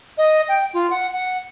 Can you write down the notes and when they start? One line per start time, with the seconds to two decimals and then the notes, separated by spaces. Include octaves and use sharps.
0.18 D#5
0.49 G5
0.74 F4
0.90 F#5
1.13 F#5